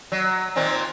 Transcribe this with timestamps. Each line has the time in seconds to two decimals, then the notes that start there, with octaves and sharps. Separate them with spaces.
0.12 F#3
0.56 A#2 D#3 C4